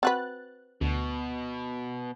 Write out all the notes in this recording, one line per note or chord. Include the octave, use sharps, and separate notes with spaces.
C4 F#4 B4 F#6 A6
D2 B2